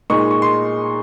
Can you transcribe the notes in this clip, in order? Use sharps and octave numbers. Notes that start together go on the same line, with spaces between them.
A#2 G#3 D#4 C#6
C#6
C6